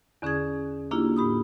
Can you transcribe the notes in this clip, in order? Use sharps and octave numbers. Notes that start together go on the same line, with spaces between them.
E2 D3 C#4 G#4 D#6 G#6
A#3 D4 E4 F4 G4
A2 G4 B5 D#6